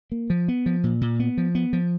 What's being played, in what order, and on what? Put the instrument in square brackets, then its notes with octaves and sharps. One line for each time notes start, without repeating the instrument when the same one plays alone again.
[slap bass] A#3
F3
B3
F3
A#2
A#2
B3
F3
B3
F3